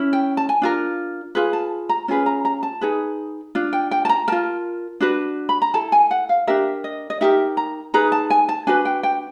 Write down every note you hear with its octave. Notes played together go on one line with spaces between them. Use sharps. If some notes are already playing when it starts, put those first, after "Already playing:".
Already playing: C#4 E4
G5
A5
G#5
D4 F4 A#4
F4 G#4 B4
A5
A#5
C#4 F4 G#4 B4
A#5
A#5
A5
D#4 G#4 B4
D4 F4
G5
G5
A5
A#5
F4 A#4 A5
D4 F#4 B4
B5
A#5
E4 A4 A5
G#5
F#5
F5
D4 G4 A#4 E5
D#5
D#5
D#4 G4 A#4 E5
A#5
D#4 G#4 B4 A#5
A5
G#5
A5
D4 F#4 B4 G#5
G5
G5